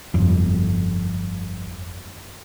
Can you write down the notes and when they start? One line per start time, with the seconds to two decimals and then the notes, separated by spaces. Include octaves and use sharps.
0.14 G1 F2